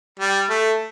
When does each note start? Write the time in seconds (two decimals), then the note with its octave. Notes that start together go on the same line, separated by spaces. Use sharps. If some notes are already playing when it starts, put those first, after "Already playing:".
0.20 G3
0.50 A3